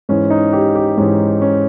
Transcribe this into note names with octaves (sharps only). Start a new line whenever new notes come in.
G#2 E3 C#4
D#4
G4
G4
G#2 E3 C#4
C#4